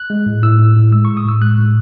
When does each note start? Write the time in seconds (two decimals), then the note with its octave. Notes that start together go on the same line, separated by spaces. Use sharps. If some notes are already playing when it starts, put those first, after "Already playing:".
Already playing: F#6
0.10 G#3
0.26 A2
0.42 A2 E6
0.58 A2
0.76 A2
0.92 G#3 E6
1.05 A2 C#6
1.17 D#6
1.25 A2 E6
1.41 G#3 F#6
1.58 A2